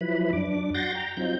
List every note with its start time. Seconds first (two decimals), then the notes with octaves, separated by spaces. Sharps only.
0.01 F3 F#3 E4 B4 B5
0.33 F#2 D4 D6
0.74 F#4 F#5 C6 G6 A6 A#6
0.95 G5 A#5
1.17 F#3 C4 D#4 F4 G6